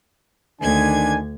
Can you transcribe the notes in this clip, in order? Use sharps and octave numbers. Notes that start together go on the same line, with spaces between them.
D2 D#3 D4 G#5 G#6